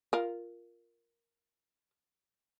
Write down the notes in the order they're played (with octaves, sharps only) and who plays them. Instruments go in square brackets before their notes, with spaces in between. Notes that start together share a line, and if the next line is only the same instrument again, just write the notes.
[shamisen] F4 A#4